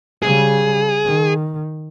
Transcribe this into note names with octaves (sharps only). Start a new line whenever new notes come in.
C#3 G3 G#4
D#3